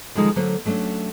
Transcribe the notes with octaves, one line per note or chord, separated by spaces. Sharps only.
D3 D#3 F3 G3 G#3 D#4
D3 F#3 A3 A#3 C5
F#3 A3 C#4 D4